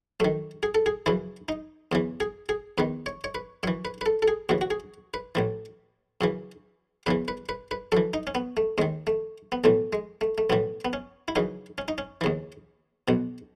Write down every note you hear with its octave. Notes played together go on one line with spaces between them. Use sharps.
F#2 D#3 A3
G#4
A4
G#4
F#2 C#3 E3 E4
D#4
E2 C#3 E3
G#4
G#4
E2 D#3 B4
C#5
C#5
B4
F#2 E3 C#5
B4
B4
A4
A4
G#4
D#2 C#3 E3 F#4
F#4
G#4
B4
A1 A2 E3
F#2 C#3 E3
E2 C#3 E3 B4
B4
B4
B4
F#2 E3 A4
D#4
C#4
B3
A3
D#2 D#3 G#3
A3
B3
B1 A2 E3 A3
G#3
A3
A3
B1 A2 E3 B3
B3
C#4
E4
F#2 C#3 E3 D#4
C#4
D#4
C#4
D#2 C#3 E3
B1 B2